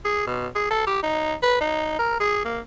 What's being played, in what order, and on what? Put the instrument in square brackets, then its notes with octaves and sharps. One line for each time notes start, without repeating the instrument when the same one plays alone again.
[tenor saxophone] G#4
B2
G#4
A4
G4
D#4
B4
D#4
A#4
G#4
A#3